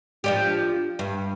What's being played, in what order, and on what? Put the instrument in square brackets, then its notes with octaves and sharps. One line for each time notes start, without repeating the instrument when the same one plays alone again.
[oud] F3 D4 G4
G2